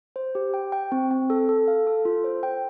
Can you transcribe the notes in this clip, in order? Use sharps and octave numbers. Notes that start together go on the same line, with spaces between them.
C5
G4
G5
G5
C4
C4
A4
A4
F5
A4
F4
C5
G5